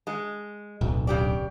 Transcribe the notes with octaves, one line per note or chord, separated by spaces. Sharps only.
G#3
D1 B1
C#3 G4 D5